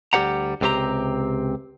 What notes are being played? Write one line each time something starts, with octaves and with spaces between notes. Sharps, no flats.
D2 G3 G4 C5 F#5 A#5
C#2 C3 C4 G4 A#5